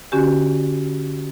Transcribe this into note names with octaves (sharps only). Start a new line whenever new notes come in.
D3 C#4 F#4 G4 G#5